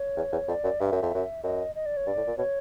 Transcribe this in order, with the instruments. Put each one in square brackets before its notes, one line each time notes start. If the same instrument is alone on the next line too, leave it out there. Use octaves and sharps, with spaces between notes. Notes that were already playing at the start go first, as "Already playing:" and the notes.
Already playing: [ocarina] C#5
[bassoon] E2
E2
[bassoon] F2 [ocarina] D5
[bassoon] F#2
[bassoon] G2 [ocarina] E5
[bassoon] F#2
F2
F#2
[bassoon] F#2 [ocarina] D#5
[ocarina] D#5
D5
C#5
[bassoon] G2 [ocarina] D5
[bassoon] A2
A#2
[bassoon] B2 [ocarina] C#5